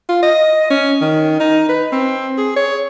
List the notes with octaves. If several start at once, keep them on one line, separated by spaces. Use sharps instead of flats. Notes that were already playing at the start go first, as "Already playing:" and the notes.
F4
D#5
C#4
D#3
D#4
B4
C4
G#4
C#5